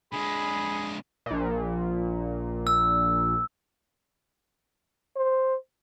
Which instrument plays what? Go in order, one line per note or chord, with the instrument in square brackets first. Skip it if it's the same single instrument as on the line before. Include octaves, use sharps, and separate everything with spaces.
[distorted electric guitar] D3 G#3 [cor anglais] G#4 [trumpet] B5
[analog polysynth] A#1 A#2
[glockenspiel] E6
[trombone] C5